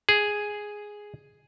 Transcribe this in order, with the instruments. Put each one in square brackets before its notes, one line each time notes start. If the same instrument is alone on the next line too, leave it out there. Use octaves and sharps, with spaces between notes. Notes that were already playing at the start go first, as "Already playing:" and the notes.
[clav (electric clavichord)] G#4